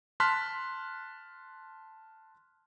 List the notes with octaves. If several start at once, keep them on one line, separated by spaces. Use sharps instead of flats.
A5 C6 F6 F#6 B6